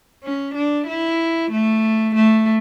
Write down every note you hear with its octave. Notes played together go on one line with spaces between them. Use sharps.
C#4
D4
E4
A3
A3